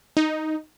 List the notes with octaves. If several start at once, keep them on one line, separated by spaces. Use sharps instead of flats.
D#4